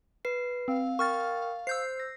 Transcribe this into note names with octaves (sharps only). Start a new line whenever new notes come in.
B4 C7
C4 F5
A#4 G5 C#6 F6 A6
C5 E6 G6 C7
A#6